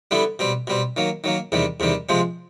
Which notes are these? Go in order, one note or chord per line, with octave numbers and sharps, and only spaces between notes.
D3 G3 B3 E4
B2 G3 C4
B2 G3 C4
D#3 F#3 A#3
D#3 F#3 A#3
E2 C3 D#3 G3
E2 C3 D#3 G3
C3 F3 G#3 C4